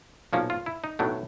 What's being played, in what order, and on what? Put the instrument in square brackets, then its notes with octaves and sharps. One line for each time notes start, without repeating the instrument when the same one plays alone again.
[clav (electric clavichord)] B1 A#2 F3 A#3 C#4
F4
E4
D#4
B1 A2 F#3 A3 D4